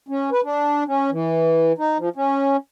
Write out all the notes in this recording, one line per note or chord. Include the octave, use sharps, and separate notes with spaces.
C#4
B4
D4
C#4
E3
D#4
F3
C#4